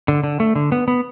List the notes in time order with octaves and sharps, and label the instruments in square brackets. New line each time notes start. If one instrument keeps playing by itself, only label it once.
[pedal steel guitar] D3
D3
A3
D3
B3
B3